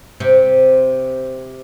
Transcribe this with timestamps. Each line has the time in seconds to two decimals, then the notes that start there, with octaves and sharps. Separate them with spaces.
0.20 C3